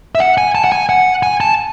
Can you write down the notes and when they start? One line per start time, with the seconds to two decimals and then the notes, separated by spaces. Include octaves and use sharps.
0.15 E5
0.20 F#5
0.38 G#5
0.55 A5
0.64 F#5
0.72 G#5
0.89 F#5
1.23 G#5
1.41 A5